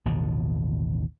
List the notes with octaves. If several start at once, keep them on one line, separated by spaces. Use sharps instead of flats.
A1 D#2 B2 D3